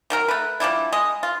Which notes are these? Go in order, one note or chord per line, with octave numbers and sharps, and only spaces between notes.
D#3 F#3 A#4
A3 B4
F3 G3 D4 E4
G#3 D#5
F4